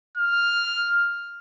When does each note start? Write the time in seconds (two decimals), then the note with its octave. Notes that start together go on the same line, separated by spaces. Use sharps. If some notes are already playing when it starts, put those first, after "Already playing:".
0.17 F6